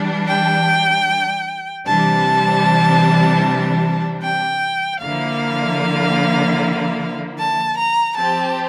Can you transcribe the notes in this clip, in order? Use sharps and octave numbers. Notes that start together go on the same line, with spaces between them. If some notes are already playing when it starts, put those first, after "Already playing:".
Already playing: E3 G3 D4
G5
C3 E3 G3 D4 A5
G5
D3 F3 A#3 E4 F5
A5
A#5
F3 C4 G4 A5